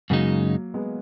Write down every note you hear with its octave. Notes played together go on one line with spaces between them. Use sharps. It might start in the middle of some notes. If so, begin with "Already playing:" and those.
F#2 C#3 F#3 G#3 A#3 D#4
G#3 B3